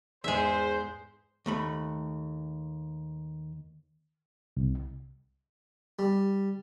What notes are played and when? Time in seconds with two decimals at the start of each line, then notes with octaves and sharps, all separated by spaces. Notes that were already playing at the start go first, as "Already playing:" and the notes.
0.24 E2 G#2 G#3 C5 E5
1.46 D#2 A3 B5
4.57 C2
5.99 G3